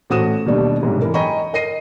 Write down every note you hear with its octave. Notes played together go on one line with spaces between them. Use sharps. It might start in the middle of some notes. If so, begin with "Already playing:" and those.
A1 A3 F#4 C5 D#6 E7
D#2 B2 G3 D4
B1 G#2 C3
E3 A#4
D#5 G5 G#5 A#5 B5 C#6
A#4 D#5 A#6 C7 D#7